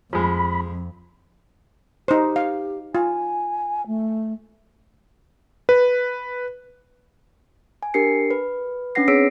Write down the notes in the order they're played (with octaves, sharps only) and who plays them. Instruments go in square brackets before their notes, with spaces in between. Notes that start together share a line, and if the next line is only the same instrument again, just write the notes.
[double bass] F2 [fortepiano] F3 G#3 [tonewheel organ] B5
[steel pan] D#4 C5 [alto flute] G4
[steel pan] F5
[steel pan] F4 [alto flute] G#5
[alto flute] A3
[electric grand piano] B4
[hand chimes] G#5
D4 G4 A#4 C7 C#7
B4
C#4 D4 B4 F#5 A#6 C7
C4 G#4 C#5 E6 B6 D7